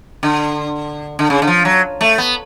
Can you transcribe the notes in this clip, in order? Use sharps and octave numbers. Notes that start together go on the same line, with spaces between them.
D3
D3
C#3
D3
F3
F#3
A3
B3